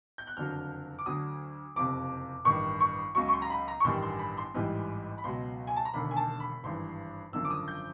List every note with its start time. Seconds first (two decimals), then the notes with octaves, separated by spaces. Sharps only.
0.18 G6
0.27 F#6
0.37 F#1 F2 D3 F#3 F6
0.99 D6
1.06 D2 D3 F#3 D#6
1.75 F#1 F2 C3 D6
2.45 A1 G2 D#3 C#6
2.80 C#6
3.15 C#2 C#3 F#3 C#6
3.28 C#6
3.33 C6
3.42 A#5
3.50 B5
3.68 A#5
3.80 C#6
3.84 A1 G2 D#3 G3 C6
4.02 C6
4.19 B5
4.37 C6
4.54 A1 G#2 E3 G3
5.18 B5
5.24 C#2 B2 F#3 C6
5.67 G#5
5.76 A5
5.85 A#5
5.93 E1 D#2 D3 B5
6.11 G#5
6.17 A5
6.40 B5
6.63 G#1 G2 E3 C6
7.33 G#1 F#2 D3 F3 E6
7.45 D6
7.50 D#6
7.68 G6